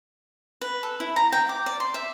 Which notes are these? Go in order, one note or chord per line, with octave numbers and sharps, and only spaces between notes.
B4
A4
E4
A#5
G5
D6
D5
C6
E5